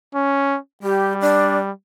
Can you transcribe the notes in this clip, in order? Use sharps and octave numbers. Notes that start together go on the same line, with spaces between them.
C#4
G3 G4
D4